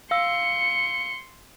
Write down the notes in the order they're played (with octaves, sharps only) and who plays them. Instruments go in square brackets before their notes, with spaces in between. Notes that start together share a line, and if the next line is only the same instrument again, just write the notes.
[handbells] F5 E6 [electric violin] C6 C#7